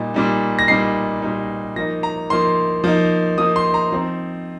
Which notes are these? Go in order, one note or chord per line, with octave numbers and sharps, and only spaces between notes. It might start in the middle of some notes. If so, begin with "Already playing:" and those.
Already playing: A#2 G3 D#4
A#2 G3 D#4
A#6
A#2 G3 D#4 C7
A#2 G3 D#4
F3 A#3 D#4 A#6
A#5
F3 A#3 D#4 C6
F3 A#3 D#4
F3 A#3 D#4 D#6
C6
A#5
F3 C4 D#4